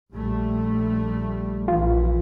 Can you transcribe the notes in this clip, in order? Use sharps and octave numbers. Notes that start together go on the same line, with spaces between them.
A#1 G3 A3
A#1 E3 F4